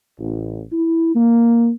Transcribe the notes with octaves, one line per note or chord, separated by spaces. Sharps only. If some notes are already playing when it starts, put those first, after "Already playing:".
A1
E4
A#3